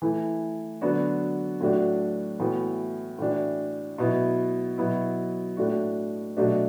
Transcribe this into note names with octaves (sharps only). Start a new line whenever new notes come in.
E3 A3 E4
D3 F#3 B3 D4 F#4
A2 F#3 A3 D4 F#4
A2 E3 B3 F#4
A2 E3 D4 F#4
B2 F#3 B3 E4
B2 F#3 B3 E4
A2 A3 D4 F#4
B2 F#3 A3 D4 F#4